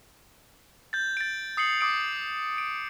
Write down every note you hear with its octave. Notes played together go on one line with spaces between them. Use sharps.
G6 A6
A6 D7
D#6 C7 C#7 F#7
D6 D#6 D7
D7